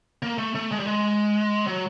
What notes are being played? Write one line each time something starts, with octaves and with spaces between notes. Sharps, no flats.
A#3
A3
A3
G#3
G3
G#3
F#3